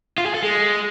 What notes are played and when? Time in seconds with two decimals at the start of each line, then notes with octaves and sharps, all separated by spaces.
0.18 F4
0.26 G#4
0.34 A4
0.43 G#3